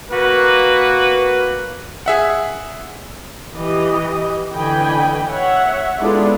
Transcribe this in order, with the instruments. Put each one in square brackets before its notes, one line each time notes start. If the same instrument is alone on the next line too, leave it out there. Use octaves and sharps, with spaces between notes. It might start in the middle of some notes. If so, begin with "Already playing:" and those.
[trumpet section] A#3 F#4 B4
[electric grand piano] G#4 E5 F#5
[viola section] E3 G4 D#5
D3 E3 D#5 G5 G#5 B5
C#5 E5 F#5
G#3 B3 D4 E4 F4 A4